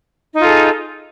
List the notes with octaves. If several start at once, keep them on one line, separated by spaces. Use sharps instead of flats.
D#4 F4 G#4 A4